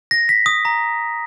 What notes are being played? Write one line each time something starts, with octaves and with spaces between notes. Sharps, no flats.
A#6
B6
D#6
A#5